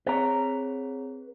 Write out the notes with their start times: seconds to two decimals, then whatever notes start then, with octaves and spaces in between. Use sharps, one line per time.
0.07 C4 G#4 B4 C#5 A#5